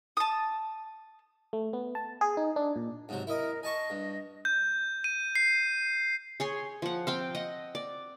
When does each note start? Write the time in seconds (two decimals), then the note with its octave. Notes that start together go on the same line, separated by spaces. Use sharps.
0.17 A5 D#6
1.53 A3
1.73 B3
1.95 A5
2.21 G#4
2.37 D#4
2.56 D4
2.76 A#2
3.09 G#2 C3 F#3
3.27 E4 A#4 D#5
3.63 D#5 G#5 A5 C#6
3.90 G2
4.45 G6
5.04 D#7
5.35 C7
6.40 G#4 C#5 C6
6.82 F3 F#5
7.07 C4 F5 G5
7.35 D#5 F#5
7.75 D5